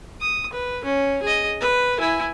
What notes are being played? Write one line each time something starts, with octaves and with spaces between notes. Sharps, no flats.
D#6
B4
C#4
G#4 D#5
B4
E4 G#5